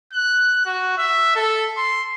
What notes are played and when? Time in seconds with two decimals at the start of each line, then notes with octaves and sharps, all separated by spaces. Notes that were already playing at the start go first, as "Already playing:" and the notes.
0.13 F#6
0.66 F#4
0.98 E5
1.36 A4
1.77 C6